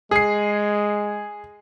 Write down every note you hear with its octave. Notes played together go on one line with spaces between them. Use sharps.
G#3 G#4 C7